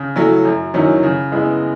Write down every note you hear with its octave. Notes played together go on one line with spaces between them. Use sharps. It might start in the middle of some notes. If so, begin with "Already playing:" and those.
Already playing: C#3
F#3 A3 C#4 E4
F#2
D#3 F#3 C#4 E4
C#3
G#3 B3 E4